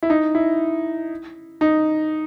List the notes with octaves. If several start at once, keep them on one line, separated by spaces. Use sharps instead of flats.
E4
D#4
E4
D#4